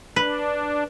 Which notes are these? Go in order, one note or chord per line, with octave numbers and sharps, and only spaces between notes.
D4 B4